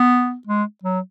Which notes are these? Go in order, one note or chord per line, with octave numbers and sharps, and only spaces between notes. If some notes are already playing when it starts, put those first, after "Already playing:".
Already playing: B3
G#3
F#3